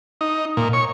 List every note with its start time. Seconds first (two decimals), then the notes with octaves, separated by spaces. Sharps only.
0.21 D#4
0.57 A#2
0.73 C#5